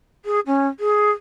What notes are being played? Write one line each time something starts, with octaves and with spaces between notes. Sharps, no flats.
G#4
C#4
G#4